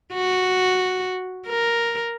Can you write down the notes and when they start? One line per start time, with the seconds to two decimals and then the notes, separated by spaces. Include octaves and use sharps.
0.13 F#4
1.46 A#4